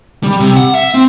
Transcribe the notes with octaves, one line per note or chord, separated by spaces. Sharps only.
G3
C3
F#5
E5
C4